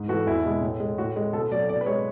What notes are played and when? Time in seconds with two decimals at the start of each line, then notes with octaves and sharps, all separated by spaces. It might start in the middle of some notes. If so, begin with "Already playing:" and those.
Already playing: G#2
0.08 E3 A3 F#4
0.26 E2 E4
0.45 B2 G#3
0.62 A2
0.80 G#3
0.98 A2 F#4
1.16 G#3
1.33 B2 A4
1.51 F#3 A3 D5
1.69 B2 D5
1.81 B4
1.86 G#3 C#5